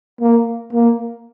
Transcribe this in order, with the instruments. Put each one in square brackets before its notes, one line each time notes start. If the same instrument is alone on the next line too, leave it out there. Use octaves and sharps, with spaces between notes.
[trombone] A#3
A#3